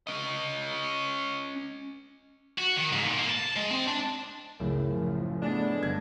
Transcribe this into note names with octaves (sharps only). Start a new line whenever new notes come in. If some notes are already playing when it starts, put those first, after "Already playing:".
C#4 D#5
F#4
D#3
G#2
A#2
A#3
A5
G#3
C4
D4
C#2 F#2 A2 C#3 A#4
F3
F#3
G#3 A3 B3 D4
G1 D3 G#6